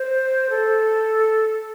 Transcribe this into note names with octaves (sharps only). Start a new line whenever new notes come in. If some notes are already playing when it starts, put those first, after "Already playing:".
Already playing: C5
A4